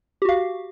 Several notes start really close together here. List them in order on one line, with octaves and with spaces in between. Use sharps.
G4 F#4 F5